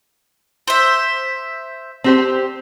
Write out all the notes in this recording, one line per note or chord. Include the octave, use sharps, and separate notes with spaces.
C5 E5
C4 G4 C5